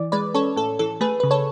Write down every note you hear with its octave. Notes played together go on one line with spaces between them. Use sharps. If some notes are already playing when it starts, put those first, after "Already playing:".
Already playing: E3 D5
G#3 B4 D5
C#4 A4 C#5
A2 A4
E3 A4
A3 G#4 B4
C#3 B4
A4 C#5